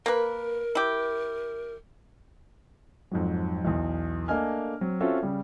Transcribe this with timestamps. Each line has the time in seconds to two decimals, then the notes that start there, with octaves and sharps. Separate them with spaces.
0.06 A#3 A#4 B4
0.75 E4 G4
3.11 F2 G#2 F#3
3.65 B1 E2
4.28 A3 A#3 D4 D#5 G#5 F6
4.81 F#3 C4
5.00 C4 C#4 F4 F#4 A4 E5
5.23 C#3 G3